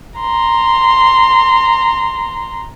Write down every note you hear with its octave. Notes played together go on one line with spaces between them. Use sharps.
A#5 C6